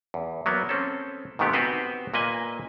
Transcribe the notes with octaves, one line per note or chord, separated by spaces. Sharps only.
E2
F#3 A#3 B3
C4 C#4 A4
G#2 C3 D#3 A3 B3 G4
B3 C4 F#4 G4 B4 C5
A#2 A#3 B4 D#5 G#5